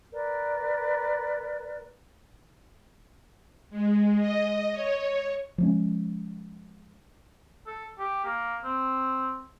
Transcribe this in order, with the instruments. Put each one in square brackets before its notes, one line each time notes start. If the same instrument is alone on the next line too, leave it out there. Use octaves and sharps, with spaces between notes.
[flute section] A#4 B4 D5
[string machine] G#3
D#5
C#5
[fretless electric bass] F3 G#3 C#4
[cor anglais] A4
G4
A#3
C4